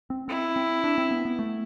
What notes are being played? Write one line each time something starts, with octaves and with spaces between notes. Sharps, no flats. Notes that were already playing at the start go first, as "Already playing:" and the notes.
C4
C4 E4
C4
D4
C4
B3
B3
A3